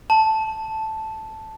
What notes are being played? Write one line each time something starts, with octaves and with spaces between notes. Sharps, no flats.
A5